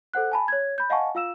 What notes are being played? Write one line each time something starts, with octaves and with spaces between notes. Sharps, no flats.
A4 C5 F#5 F#6
G#5 A5 B5
C#5 G#6
B5 G6
D#5 F5 F#5 G#5 A5 C#6
F4 F5 E6 E7